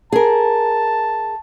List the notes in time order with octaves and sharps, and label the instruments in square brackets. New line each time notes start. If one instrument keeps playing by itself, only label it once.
[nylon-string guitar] G#4 A#4 [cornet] A5